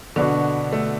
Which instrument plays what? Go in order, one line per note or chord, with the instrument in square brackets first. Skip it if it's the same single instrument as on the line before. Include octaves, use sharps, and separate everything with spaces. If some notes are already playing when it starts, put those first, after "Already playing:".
[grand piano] B2 B3 D4 F#4 [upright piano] D3
[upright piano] A3